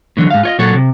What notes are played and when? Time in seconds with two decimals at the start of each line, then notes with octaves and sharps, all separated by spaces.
0.17 A2 D3 E3 F#3
0.30 G#2 F5
0.43 F4 C#5 D#5
0.59 A#2 F#3 F#4 A4 C#5
0.74 C3